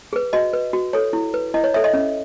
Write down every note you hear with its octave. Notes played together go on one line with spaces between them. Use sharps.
G#4 B4
F#4 D#5
B4
F#4
A4 C#5
E4
B4
E4 D#5
C#5
A4 C#5 E5
D#5
C#4